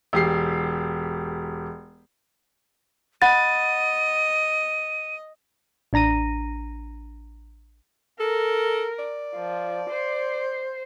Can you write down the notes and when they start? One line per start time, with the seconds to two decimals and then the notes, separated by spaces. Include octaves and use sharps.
0.13 E1 G4 C7
3.22 D#5 F#5 B5 A6 D#7
5.93 A1 D4 A#5 A#6 D#7
8.20 A4 A#4
8.99 D5
9.35 F3
9.90 C5